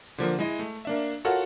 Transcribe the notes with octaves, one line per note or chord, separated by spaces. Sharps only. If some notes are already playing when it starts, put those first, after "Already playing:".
D3 F3 A#3
G#3 E4 D#5
A3
A#3 D4 E5
F4 F#4 A4 A#4 C#5 F#5